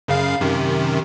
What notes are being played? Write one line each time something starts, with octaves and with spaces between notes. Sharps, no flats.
F#2 C#3 F5
F#2 C3 D#3